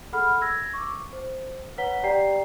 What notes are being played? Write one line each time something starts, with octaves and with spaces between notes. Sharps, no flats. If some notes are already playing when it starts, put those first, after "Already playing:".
G#4 A4 F#5 B5 F6
E6 G#6 A#6
C#6 D6
C5
B4 C#5 F#5 A#5 B6 G7
G4 D5 G5 A#5 C7